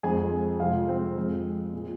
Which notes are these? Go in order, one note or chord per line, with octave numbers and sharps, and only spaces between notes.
F2 F3 G#3 G#4 G#5
F2 C3 G#3 F4 F5
C4 C5
F2 F3 G#3
A#2 G#3